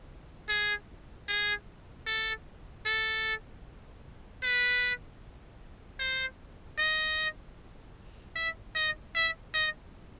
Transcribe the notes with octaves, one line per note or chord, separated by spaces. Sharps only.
G#4
G#4
A4
A4
B4
C5
D#5
E5
D#5
E5
D#5